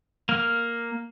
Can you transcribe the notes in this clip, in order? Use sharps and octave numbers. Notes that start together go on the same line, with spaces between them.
A#3 F6